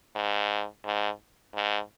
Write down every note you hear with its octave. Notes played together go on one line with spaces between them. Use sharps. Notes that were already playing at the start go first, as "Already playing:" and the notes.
G#2
G#2
G#2